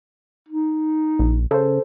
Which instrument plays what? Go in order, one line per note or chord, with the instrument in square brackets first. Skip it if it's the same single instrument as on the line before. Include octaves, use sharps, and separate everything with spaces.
[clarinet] D#4
[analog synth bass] A#1
[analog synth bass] C#3 [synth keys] A4 C5